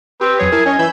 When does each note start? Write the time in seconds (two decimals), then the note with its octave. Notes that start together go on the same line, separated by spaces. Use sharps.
0.21 C4 G4 B4
0.39 F2 F#3 G#4 C#5
0.52 E4 A#4 G#5 A5
0.66 C#4 C#5 D#5 G#5
0.79 E3 B5 E6 G6